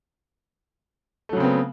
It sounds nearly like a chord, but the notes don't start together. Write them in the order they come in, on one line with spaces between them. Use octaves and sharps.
A3 F#3 C#3 C4 B3